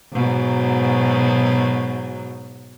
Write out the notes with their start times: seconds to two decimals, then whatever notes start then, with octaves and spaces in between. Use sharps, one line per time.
0.12 G#2 B2 F#3